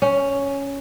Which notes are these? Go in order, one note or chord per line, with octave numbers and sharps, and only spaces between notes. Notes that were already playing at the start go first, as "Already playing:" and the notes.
C#4